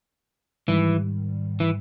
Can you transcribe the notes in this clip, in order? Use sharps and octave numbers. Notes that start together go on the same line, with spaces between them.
G#2 D#3 E3 G3
E3